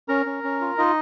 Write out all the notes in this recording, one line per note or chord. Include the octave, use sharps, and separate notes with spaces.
C#4 A#4 A#5
C#4
C#4
F4
D#4 F4 D#5